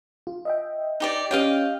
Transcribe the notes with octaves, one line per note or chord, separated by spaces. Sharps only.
F4
D#5 E5 G5
D#4 G4 D5
C#4 G4 C#5 D#5 F5 G5